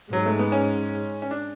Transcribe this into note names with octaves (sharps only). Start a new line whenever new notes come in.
G#2 F#3
A3
B3
C#4
C#4
D4